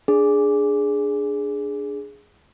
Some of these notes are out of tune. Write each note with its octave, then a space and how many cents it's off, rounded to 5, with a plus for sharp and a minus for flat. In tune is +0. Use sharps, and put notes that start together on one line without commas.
D4 -5 G#4 +0